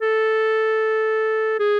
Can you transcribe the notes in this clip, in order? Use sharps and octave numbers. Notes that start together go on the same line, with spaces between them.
A4
G#4